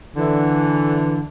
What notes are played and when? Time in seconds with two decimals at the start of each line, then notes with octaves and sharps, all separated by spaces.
0.15 D3 E3